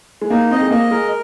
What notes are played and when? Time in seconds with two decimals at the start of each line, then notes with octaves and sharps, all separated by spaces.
0.21 G#3
0.30 A#3 D#4
0.51 C4 D#5
0.61 G#3
0.71 A#3 D#5
0.91 G#3 A#4